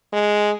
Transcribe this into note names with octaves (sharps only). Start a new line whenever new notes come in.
G#3